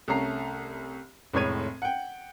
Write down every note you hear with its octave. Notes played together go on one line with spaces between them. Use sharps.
C2 A3 C#4 A#5 C7
F1 A2 G#3 C#5 G#6 D#7
F#5 G5